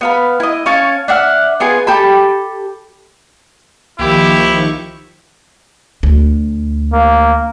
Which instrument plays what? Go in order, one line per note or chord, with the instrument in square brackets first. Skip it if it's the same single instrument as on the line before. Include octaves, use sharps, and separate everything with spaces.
[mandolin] B3 F5 B5
E4 D#5
C#4 C#5 F5 A5
D4 E5 F#5 F6
B3 F4 G#4 G#5
G4 A4 A5 B5
[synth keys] C2 A#3 [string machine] D#3 F3 C#6 [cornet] E4 [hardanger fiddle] G4
[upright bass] D2
[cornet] A#3